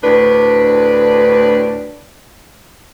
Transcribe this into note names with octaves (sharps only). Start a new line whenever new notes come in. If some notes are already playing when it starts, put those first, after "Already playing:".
D2 A2 D4 B4